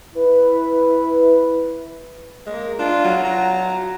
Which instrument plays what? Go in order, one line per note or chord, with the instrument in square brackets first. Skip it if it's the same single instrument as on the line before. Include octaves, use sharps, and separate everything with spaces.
[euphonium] E4 [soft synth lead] B4
[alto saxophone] G#3 [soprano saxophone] A#3
[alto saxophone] D4 [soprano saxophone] F4
[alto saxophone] F#3
[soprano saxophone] A#5